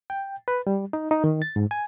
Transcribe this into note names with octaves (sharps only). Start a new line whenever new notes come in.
G5
B4
G3
D#4
D#4
D#3
A6
G#2
G#5